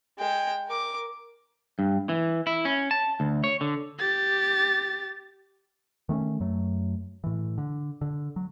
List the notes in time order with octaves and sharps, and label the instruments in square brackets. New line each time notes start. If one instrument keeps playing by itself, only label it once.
[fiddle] G#3 G5
A#4 D6
[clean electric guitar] G2
E3
E4
C#4
A5
D2
C#5
D3
[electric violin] G4 A6
[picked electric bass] D#3 A3 C4 C#4
F#2 F#3 A3
A2 E3
D3
D3
F#3